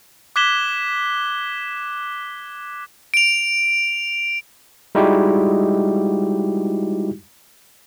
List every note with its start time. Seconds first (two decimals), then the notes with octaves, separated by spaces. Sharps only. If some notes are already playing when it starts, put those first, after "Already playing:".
0.36 D6 F#6 G#6 B6 E7 G7
3.14 D7 F7
4.95 G3 G#3 D#4 E4 F#4 G4